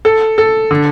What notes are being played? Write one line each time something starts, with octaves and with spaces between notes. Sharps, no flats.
A4
A4
D3